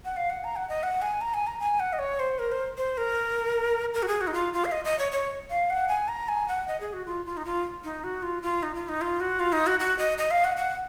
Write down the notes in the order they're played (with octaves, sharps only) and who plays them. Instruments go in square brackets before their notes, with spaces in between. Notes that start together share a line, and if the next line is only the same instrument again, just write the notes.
[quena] F#5
F5
F#5
A#5
F#5
D#5
F#5
G#5
A#5
G#5
A#5
G#5
F#5
D#5
C#5
C5
A#4
C5
C5
A#4
A#4
F#4
G#4
F#4
D#4
F4
F4
F5
D#5
D#5
C#5
C#5
F5
F#5
G#5
A#5
G#5
F#5
D#5
G#4
F#4
F4
F4
D#4
F4
D#4
F#4
F4
F4
D#4
F4
D#4
F4
F#4
F4
D#4
F#4
F#4
D#5
D#5
F5
F#5
F#5